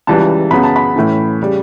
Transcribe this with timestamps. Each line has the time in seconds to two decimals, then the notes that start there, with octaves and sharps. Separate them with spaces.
0.07 C#2 C#3 E3 G3 A5
0.51 F#2 C#3 F#3 B3 B5
0.63 A5
0.76 B5
0.96 A2 E3 A3 C#4
1.41 C#3 G3